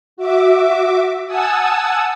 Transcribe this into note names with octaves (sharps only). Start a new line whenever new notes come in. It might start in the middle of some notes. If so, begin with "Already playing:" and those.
F#4 E5 D6
F#5 G#5 A5 D#6 E6